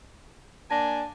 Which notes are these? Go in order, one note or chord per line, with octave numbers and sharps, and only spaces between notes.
A#3 D4 G#5 A5 A#6